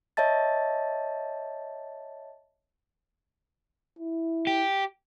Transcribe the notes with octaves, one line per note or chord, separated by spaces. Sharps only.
C#5 D#5 E5 A5 A6
E4
G4